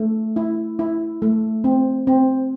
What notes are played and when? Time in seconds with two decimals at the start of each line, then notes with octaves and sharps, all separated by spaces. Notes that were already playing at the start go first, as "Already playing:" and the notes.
Already playing: A3
0.36 E4
0.79 E4
1.22 A3
1.64 C4
2.07 C4